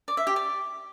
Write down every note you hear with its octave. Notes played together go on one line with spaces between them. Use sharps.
D5
E5
G4
D5